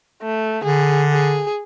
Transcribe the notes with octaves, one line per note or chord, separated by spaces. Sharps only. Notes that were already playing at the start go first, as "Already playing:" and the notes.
A3
D3 G#4
G#4